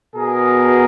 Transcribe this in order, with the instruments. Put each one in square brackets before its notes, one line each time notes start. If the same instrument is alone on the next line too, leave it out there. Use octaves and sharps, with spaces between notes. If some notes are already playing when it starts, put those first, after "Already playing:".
[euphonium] B2 [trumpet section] G#4 A#4